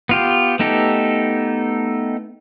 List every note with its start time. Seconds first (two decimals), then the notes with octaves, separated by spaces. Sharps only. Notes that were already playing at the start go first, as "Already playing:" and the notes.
0.09 B3 F4 G4
0.59 A3 B3 D#4 G4 A4